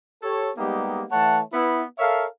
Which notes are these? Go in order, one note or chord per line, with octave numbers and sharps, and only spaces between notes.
G4 A4 C#5
G3 G#3 A#3 B3 D#4 G4
E3 A3 C#5 F#5 A5
B3 E4
A4 A#4 C#5 E5 F5